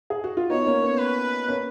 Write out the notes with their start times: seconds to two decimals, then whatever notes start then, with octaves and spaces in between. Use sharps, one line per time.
0.10 G#4
0.24 F#4
0.37 F4
0.50 B3 D#4 C#5
0.67 A#3 C#4
0.83 B3
0.99 B4
1.48 A#3 C#4